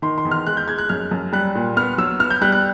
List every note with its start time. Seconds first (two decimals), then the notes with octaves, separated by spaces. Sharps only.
0.02 D#3 C6
0.18 C6
0.25 E2
0.31 F6
0.46 G#3 F#6
0.57 G6
0.68 G#3 G#6
0.78 F#6
0.89 F#2 F6
1.11 F#2
1.32 G3 F#6
1.55 A#2
1.77 B3 F6
1.98 F#3 E6
2.19 B3 F6
2.30 G6
2.41 G3 F#6
2.52 F#6